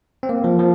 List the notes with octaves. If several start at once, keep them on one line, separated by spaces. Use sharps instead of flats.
C4
A#3
F3
F3